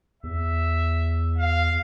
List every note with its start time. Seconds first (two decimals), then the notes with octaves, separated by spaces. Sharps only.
0.23 E2 E5
1.38 F5